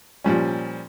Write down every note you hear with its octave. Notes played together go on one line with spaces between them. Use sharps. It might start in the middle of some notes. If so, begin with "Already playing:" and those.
A#2 F3 G3 C#4